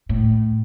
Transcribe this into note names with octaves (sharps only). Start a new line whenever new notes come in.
A2